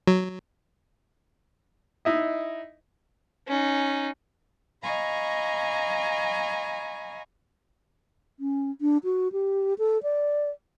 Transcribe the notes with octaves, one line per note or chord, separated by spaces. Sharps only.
F#3
D#4 E4 D#5
C#4 D#4
D#5 F5 G#5 A#5 B5 C#6
C#4
D4
F#4
G4
A4
D5